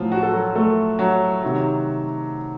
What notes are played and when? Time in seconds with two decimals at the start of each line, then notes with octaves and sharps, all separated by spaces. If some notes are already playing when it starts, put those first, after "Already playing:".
Already playing: A2 F3 F#3 F4
0.12 F#4
0.23 A4
0.33 F#3 F#4
0.55 A3 A4
0.99 F#3 F#4
1.43 C3 D#3 F#3